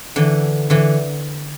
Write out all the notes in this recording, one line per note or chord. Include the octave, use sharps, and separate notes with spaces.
D3 E3
D3 E3